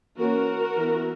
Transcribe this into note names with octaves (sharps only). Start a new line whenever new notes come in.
E3 A#3 C#4 F#4 A#4
E3 B3